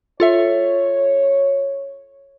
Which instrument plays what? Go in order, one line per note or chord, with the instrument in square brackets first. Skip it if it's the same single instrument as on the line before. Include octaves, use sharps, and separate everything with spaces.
[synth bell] F4 A4 E5 [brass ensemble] C#5